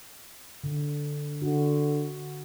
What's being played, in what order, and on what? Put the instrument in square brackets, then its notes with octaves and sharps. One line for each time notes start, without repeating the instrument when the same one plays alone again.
[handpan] D3
[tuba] D3 [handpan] F#4